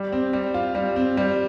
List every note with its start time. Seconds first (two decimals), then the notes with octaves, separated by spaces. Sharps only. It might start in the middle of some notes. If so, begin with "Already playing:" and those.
Already playing: G3
0.12 C4
0.33 G3
0.54 F4
0.75 G3
0.96 C4
1.17 G3